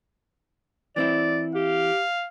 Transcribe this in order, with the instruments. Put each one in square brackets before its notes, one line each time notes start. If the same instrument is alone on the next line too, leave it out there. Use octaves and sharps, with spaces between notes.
[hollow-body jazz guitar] E3 C4 E4 [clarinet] D5
[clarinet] G4 [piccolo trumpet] F5